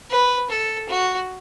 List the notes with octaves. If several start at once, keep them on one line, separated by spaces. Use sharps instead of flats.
B4
A4
F#4